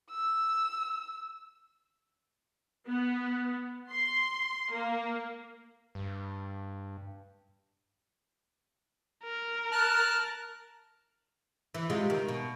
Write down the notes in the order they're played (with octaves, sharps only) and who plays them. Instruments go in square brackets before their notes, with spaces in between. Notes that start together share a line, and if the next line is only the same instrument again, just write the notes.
[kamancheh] E6
[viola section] B3
C6
A#3
[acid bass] G2
[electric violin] A#4
[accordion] A5 F6 F#6
[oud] E3
C3 G#3 F4
D#3
B2